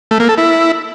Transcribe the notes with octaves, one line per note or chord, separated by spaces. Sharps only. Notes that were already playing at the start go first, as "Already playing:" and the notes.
A3
A#3
A4
E4